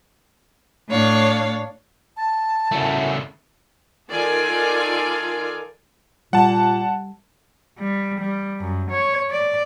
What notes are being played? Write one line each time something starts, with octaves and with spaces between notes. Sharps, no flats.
A2 D4 C#5 F5
A5
F#2 A#2 C#3 A3 E4
D#3 F4 A4 A#4 D5 G#5
A#2 G3 F#5 A5
G3
G3
F#2
C#5
D5